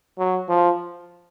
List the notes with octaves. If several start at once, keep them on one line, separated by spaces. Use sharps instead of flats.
F#3
F3